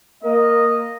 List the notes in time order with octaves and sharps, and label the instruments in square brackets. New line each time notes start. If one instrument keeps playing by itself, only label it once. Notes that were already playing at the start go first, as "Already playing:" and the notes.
[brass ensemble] A#3 A#4 D#5